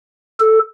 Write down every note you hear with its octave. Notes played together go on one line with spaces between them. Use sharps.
A4